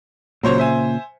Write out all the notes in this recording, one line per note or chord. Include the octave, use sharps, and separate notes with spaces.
A#2 C#3 F#3 C5 C#5
C5 E5 G#5